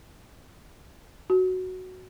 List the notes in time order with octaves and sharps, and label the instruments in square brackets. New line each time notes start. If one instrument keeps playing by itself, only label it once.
[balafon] F#4